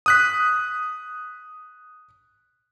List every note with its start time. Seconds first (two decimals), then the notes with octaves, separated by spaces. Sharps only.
0.06 D#6 F#6 B6